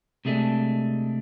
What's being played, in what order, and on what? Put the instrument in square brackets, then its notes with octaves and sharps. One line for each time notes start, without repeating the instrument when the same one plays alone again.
[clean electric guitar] C3 G#3 A3 D4